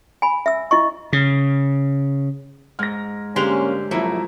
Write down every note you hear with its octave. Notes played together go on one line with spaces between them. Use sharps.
G#5 B5
E5 E6
E4 D#5 C#6
C#3
G#2 F6 A#6
D3 G3 G#3 A#3 C#4 G4 C5 F7
C2 F3 F#3 A3 A#3 E4